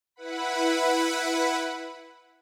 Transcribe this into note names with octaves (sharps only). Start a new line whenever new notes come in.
E4 B4 F#5 B5